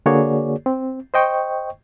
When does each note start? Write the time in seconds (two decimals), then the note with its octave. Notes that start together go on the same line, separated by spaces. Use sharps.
0.06 D3 A#3 F#4 G#4 C#5 D5
0.66 C4
1.14 C5 D#5 G5 C#6